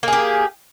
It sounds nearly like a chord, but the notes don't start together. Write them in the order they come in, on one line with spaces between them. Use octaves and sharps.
A#3 G#4 G4